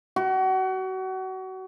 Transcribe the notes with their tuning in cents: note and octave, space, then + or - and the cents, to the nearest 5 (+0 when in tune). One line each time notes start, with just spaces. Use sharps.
F#4 +30